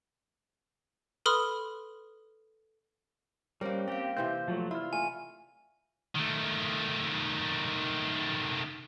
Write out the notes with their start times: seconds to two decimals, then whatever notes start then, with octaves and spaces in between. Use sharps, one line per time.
1.26 A4 B4 B5 C6 D#6 F6
3.61 G3 A#3 C#4 A#4 C5 C#5
3.88 C4 G4 F5 G5 A#6
4.17 C3 E3 C4 G6
4.48 F3 F#3 A3
4.71 E4 F4 D5 F6
4.93 A3 G#5
6.16 D#3 A3